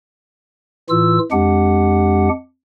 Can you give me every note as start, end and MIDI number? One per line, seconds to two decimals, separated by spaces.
0.89 1.19 45
0.89 1.19 52
0.89 1.19 65
0.89 1.19 88
1.32 2.29 41
1.32 2.29 56
1.32 2.29 62
1.32 2.29 67
1.32 2.29 78